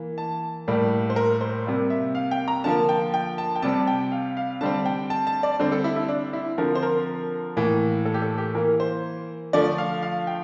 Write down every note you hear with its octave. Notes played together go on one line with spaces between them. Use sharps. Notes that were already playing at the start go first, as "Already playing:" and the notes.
Already playing: E3 A#3
A5
A2 G3 A#3
C5
A#4
C5
C3 G3 A#3
E5
F5
G5
A#5
D3 F3 A#3 A5
G5
G5
A5
G5
C3 G3 C4 A5
G5
F5
F5
D3 G3 C4 A5
G5
A5
A5
D5
D3 G3 C4
A4
E4
E4
D4
E4
D3 F3 C4 A#4
C5
A#4
A2 E3 A#3
A4
G4
A4
G4
E3 A#3 A#4
C5
D3 F3 A3 D5
F5
F5
G5